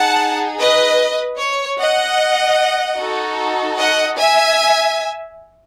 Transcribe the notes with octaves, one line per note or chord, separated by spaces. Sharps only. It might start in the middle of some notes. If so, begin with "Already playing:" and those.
Already playing: D#4 G#4 F#5 A5
B4 D#5
C#5
D#5 F#5
D#4 F#4 A4
D#5 F#5
E5 G#5